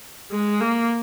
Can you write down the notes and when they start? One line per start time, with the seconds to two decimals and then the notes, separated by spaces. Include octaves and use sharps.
0.31 G#3
0.60 A#3